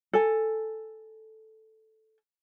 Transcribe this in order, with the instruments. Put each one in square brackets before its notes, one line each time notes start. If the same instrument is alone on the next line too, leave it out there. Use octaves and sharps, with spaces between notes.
[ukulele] A4 G#5